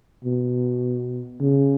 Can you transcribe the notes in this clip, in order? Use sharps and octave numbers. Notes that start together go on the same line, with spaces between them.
B2
C#3